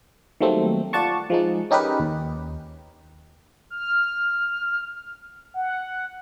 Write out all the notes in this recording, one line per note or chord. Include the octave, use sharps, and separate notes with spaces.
D#3 F#3 G3 A3 A#3 C4
F4 D5 F#5 A5 C#6
F3 G#3 D#4
C#4 D#4 G4 A#4 B4
D#2
F6
F#5